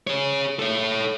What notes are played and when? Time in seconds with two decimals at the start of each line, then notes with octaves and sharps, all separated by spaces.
0.07 G#4 C#5
0.59 A4 C#5